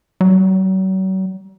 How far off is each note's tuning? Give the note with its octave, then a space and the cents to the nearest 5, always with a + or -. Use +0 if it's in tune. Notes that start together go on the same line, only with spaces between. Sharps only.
F#3 +40